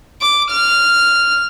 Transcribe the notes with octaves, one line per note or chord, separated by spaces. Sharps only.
D6
F6